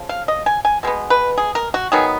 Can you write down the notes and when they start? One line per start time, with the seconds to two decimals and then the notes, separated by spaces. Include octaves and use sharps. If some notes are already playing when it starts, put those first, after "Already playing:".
Already playing: C#3 F3
0.09 F5
0.28 D#5
0.46 G#5
0.65 G#5
0.83 B2 G#3 B3
1.10 B4
1.38 G#4
1.55 A#4
1.74 F#4
1.92 D#3 F#3 B3 G#4